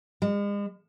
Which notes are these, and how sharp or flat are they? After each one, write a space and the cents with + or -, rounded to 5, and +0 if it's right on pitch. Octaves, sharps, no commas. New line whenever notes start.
G#3 -40